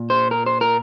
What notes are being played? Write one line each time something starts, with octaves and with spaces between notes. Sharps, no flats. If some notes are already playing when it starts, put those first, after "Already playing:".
Already playing: A#2
C5
A#4
C5
A#4